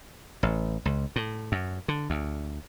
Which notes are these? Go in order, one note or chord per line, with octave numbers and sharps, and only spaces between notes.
A1
C#2
A2
F#2
D3
D2